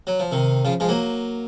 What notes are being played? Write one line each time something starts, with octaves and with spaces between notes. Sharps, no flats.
F#3
F3
C3 D#3
C#3 F3
F3 G#3
F#3 A#3